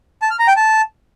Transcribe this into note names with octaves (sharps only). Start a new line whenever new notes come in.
A5
F6
A#5
G5
A5